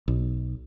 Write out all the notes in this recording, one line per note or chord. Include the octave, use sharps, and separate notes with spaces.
B1